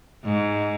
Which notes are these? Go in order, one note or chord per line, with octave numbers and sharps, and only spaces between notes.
G#2